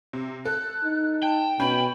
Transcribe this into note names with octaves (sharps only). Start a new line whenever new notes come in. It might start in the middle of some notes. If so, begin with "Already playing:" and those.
C3
A4 F#6
D#4
G5 A5
B2 C#4 B5 G6